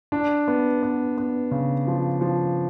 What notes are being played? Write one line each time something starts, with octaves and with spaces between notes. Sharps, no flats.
D4
B3
B3
B3
C#3
F3
F3